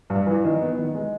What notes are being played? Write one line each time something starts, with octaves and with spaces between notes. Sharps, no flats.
G2
E3
D#3
B3
D#3
G#3